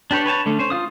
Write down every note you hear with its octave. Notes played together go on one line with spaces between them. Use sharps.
D4 G4 B4 C#5
B4 C#5 G#5 A5
D3 A3 C#4
C#4 C5
F4 F5 D#6